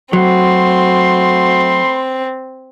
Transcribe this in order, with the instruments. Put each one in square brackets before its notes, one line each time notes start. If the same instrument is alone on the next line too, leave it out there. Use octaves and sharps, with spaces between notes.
[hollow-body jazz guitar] F#3 [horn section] A3 B5 C6 [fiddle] C4 [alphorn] F#4